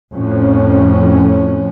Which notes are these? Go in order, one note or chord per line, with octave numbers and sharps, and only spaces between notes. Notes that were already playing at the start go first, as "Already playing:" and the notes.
F2 A2 C#4